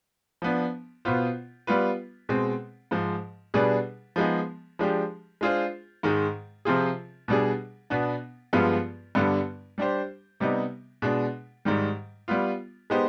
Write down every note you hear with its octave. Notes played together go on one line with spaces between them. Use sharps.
F3 B3 D4
B2 B3 F4 C5
G3 B3 F4 B4
B2 G#3 C4
G#2 F3 G#3
B2 G3 D4 G#4 B4
F3 G#3 B3 D#4 G#4
F3 G#3 D4 G4
G#3 D4 F4 G#4 C5
G#2 D#3 G#3
C3 F3 C4 F4 G#4
B2 G3 D4 G#4
B2 B3 D4
G2 F3 G#3 B3 F4
G2 D3 G3 B3
G3 D4 G4 C5
C3 G3 B3 D#4
B2 G#3 D4
G#2 D#3 G3
G3 B3 F4
G#3 B3 D#4 G4 C5